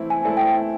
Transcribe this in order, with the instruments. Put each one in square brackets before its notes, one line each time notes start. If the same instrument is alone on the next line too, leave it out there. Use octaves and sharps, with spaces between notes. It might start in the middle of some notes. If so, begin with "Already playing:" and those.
Already playing: [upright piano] E3 A3 C4 E4
[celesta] G#5
[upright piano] A3 C4 E4 A4
[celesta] G5